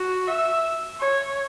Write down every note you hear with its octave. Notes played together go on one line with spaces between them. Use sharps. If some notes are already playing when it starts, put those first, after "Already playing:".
Already playing: F#4
E5
C#5